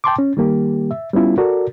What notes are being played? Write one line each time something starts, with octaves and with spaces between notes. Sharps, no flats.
G5 A5 C6 D6
C#4
D#3 G3 A#3 G4
E5
G3 B3 C#4 E4 F4
F#4 A4 A#4 D5